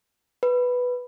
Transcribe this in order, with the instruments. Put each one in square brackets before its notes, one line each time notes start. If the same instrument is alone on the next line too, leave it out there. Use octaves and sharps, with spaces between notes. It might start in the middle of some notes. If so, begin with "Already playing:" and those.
[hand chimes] B4